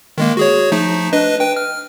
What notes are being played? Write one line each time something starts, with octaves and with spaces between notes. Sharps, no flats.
D#3 G#3 A#3
F#4 G#4 C#5
F3 A3 D#4
D4 B4 D#5
B4 G5
F6